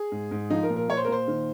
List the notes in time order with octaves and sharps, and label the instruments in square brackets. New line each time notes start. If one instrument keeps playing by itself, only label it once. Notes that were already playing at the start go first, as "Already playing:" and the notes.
Already playing: [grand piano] G#4
G#2
G#2
F3 D#4
A#4
A#2
A#4
A#2 C#5
C5
A#4
A#2 C5
D#3